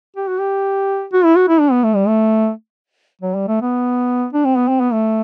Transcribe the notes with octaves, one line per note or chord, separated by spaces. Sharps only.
G4
F#4
G4
F#4
E4
F#4
E4
D4
B3
A3
G3
A3
F#3
G3
A3
B3
D4
C4
B3
C4
B3
A3